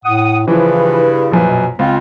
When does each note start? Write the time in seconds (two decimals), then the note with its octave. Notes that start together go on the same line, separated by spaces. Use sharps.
0.05 A2 F#5 D#6
0.48 G2 C#3 E3 F3 E4 B4
1.32 A#1 F#2 F3 B4
1.47 B2
1.79 C#2 C4 F4